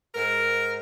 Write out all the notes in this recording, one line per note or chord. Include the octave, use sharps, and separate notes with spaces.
G#2 A#4
G#2